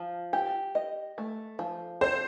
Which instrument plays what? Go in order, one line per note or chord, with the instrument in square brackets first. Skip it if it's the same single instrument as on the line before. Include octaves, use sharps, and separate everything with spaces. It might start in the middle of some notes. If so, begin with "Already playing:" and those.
Already playing: [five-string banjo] F3
G4
D#5
A3
F3
[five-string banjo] A4 [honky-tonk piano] C5